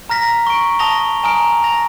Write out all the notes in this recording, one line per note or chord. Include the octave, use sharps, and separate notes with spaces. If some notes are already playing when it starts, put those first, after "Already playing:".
A#5 F6 A#6 B6
C#6 D7
A5 D#6 A#6 F7 G7
G#5 A#5 D#6 F6 D7
A#6 F7